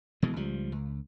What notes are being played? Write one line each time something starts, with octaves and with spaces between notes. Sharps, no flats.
F1 B2 E3 G#3
C#2 F3 G3
C#2